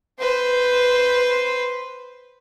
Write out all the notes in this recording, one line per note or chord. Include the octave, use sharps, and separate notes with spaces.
B4 C5